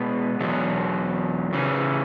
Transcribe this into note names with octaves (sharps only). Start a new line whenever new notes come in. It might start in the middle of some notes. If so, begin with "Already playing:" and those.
Already playing: B2 G#3 B3
E2 B2 F#3
C#3 E3 C#4